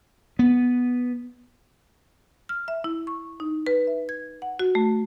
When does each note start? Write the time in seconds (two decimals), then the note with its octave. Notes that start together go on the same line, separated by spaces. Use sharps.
0.39 B3
2.49 F6
2.68 E5
2.84 E4
3.07 C#6
3.40 D#4
3.67 B4
3.87 E5
4.09 G#6
4.42 F#5
4.59 F#4
4.75 A3